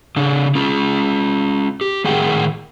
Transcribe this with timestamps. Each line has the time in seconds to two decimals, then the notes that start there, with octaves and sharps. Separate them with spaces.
0.16 C#3 D4
0.55 C#4 F4
1.81 G4
2.05 A2 D#3 G#4 F#5 G5